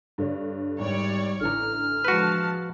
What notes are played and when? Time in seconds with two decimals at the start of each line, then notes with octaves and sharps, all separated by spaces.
0.18 G2 D3 C#5
0.79 G#1 G3 C#5 D5
1.41 A1 D3 E3 A#5 F6
2.05 F3 G#3 F#4 B4 A5